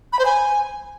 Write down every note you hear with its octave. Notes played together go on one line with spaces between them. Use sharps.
B5
C5
G#5